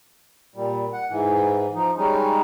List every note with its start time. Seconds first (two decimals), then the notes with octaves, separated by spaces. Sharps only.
0.56 A#2 G3
0.93 F#5
1.10 G#2 E3
1.75 F3 D#4
1.98 G3 G#3 C#4 D#4